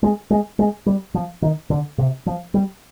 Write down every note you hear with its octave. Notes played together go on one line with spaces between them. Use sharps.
G#3
G#3
G#3
G3
F3
D#3
D3
C3
F3
G3